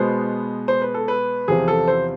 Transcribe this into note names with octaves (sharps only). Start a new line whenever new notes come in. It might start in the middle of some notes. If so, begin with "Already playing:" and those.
Already playing: B2 G#3 B3 C5
C5
B4
A4
B4
E2 C3 F3 G#4
A4
C5